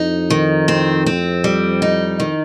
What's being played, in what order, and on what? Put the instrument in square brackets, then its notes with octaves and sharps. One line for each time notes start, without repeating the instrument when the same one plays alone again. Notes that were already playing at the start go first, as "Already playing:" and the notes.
Already playing: [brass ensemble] F2 [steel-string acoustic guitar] D#4
[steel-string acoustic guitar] D#3
C4
C4
G3
D#4
D#3